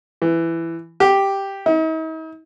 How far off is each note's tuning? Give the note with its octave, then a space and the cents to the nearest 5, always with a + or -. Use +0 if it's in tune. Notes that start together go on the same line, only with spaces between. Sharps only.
E3 +10
G4 +0
D#4 +45